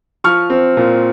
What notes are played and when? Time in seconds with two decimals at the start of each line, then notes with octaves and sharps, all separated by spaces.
0.24 F3 C#6 F6
0.50 C4
0.77 A#2